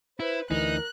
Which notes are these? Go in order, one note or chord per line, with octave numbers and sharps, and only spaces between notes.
E4 B4 C5
D2 E3 D#4 A#4 F#6